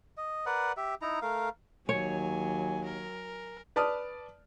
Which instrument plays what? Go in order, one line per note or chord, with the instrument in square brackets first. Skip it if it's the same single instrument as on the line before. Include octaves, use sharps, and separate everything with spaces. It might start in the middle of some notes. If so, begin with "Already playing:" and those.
[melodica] D#5
A#4 B4 D5 F#5
G4 E5
D#4 E4 A#5
A3 A#4 F5
[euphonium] D#2 [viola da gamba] F#3 [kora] C#5 [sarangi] G#5
[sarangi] A#4
[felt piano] B4 D5 A5 D#6 F6